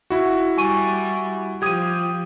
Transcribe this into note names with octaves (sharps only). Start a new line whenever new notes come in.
E4 F#4
G3 G#5 C#6 D#7
F3 G4 D#6 G#6 D#7